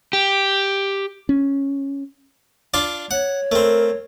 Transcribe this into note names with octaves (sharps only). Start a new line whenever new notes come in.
G4
C#4
D4 F4 D5
C#5 F#5
A3 C4 A#4